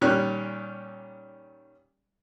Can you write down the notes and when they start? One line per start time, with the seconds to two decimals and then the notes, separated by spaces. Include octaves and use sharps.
0.01 A#2 D#3 G3 C#4 F6 F#6